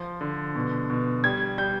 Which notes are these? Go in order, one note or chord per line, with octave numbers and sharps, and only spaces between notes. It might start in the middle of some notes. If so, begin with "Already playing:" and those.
Already playing: F3
D3
B2
B2
G3 G#6
G3 G6